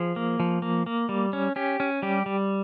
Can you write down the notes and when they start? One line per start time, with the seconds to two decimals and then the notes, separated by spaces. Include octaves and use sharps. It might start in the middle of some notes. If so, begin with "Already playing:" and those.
Already playing: F3 G#4
0.16 A#3
0.40 F3
0.62 A#3
0.86 A#3
1.09 G3
1.33 C#4
1.56 C#4 G4
1.80 C#4
2.02 G3 G4
2.26 G3